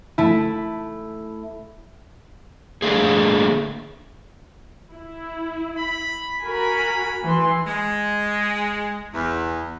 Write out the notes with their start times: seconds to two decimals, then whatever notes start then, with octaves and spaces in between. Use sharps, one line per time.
0.18 A3 E4
2.82 D3 A3 A#3 G#4
4.92 E4
5.78 B5
6.44 F#4 A#4 G#5 B5
7.24 E3 B4 C6
7.67 G#3
9.14 E2